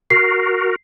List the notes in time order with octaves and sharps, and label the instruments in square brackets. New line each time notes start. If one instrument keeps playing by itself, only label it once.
[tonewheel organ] F#4 A#4 [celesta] C7